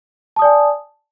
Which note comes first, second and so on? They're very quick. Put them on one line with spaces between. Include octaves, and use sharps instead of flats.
A5 D#6 D5 G#5